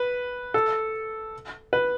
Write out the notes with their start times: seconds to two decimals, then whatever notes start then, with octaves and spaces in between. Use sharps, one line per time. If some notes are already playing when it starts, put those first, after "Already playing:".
Already playing: B4
0.54 A4
1.73 B4